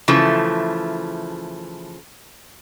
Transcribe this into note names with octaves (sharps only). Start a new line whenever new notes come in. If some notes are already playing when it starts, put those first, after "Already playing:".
C#3 E3 F3 A3